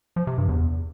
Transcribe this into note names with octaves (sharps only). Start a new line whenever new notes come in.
F3
C3
G2
E2